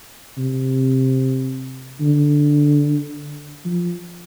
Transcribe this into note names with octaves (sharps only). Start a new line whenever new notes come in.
C3
D3
F3